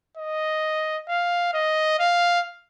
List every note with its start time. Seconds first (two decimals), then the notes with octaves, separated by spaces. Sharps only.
0.17 D#5
1.09 F5
1.54 D#5
2.00 F5